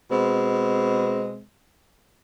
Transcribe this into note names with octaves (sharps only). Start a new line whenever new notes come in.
B2 G#3 C4